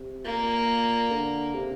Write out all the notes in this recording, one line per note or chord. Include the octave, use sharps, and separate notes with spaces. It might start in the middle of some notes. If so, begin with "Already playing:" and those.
Already playing: C3
A#2 A#3
D3
C3